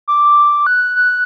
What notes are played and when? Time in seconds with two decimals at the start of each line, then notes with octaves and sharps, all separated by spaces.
0.08 D6
0.67 F#6
0.96 F#6